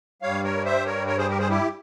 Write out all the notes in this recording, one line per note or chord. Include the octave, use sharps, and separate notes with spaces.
G2 G3 C#5 F5
A#4 C#5
C5 E5
A#4 C#5
A#4 C#5
G#4 C5
G4 A#4
G#4 C5
E4 G4